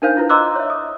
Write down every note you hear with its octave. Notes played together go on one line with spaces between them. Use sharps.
D4 D#4 A#4 C5 F5 G6
D4 E4 F4 B4
D#5 A#5 C6 D6 E6 F#6
C#5 E5
D#6